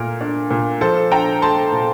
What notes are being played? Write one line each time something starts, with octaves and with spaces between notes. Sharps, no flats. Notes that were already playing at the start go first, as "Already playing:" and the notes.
Already playing: A#2 A3 A#4
D4
A#2
F3 A4 C5
D4 G5 A#5
A3 A5 C6
A#2